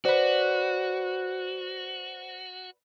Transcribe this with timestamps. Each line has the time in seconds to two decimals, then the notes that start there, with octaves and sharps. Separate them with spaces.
0.05 F#4 B4 C5 D5